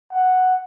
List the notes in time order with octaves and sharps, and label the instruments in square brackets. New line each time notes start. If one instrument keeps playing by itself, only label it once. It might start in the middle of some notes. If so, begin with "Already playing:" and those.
[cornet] F#5